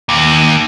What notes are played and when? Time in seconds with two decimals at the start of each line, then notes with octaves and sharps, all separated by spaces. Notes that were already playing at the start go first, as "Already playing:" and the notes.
0.09 D#2